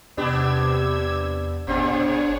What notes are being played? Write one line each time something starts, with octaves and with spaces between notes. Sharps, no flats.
E2 C3 B3 D4 G4 E6 G#6
G1 A#2 C4 D4 G#4 C#5